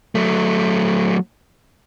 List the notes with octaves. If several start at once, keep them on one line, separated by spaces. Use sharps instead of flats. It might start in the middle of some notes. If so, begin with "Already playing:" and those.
F#3 A3